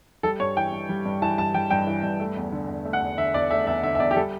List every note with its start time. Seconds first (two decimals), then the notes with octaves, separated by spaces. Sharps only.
0.23 G3 A4
0.40 G2 C#5
0.56 E3 G5
0.72 G2
0.89 G3
1.05 G2
1.22 E3 A5
1.38 G2 A5
1.54 G3 G5
1.71 G2 G5
1.87 E3
2.03 G2
2.20 A3
2.37 E2
2.52 D3
2.68 E2
2.85 A3
2.93 F#5
3.01 E2
3.18 D3 E5
3.34 E2 D5
3.51 A3 E5
3.67 E2 E5
3.83 D3 E5
3.95 E5
4.00 E2 D5
4.11 G4
4.16 G3 A4